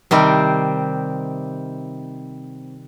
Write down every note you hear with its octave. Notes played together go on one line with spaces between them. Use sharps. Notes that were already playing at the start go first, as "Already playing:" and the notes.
C3 D#3 G3 C4